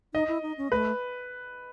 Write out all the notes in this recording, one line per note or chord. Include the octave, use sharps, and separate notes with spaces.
D#4 D#5
E4
D#4
C#4
A3 B4